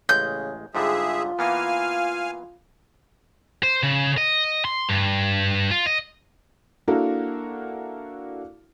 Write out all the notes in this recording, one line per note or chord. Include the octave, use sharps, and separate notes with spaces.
A1 C#3 G#3 G6
G#2 D3 G3 F4 G#4 E5
E3 A#3 B3 F5 G#5 F6
C5
C#3
D#5
C6
G2
F4
D#5
A#3 D4 E4 F#4 A4 A#4